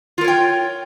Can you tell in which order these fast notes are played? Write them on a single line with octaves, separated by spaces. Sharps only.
F4 A#4 C#5 G5